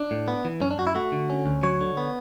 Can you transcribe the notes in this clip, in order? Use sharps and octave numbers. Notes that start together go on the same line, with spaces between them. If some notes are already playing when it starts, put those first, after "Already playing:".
Already playing: D4
A2
B3
E3
F#2 C#4
D4
F#2 F#4
E4
A3 F#4
D3
C#4
D2
F#3 C#5
D3
B3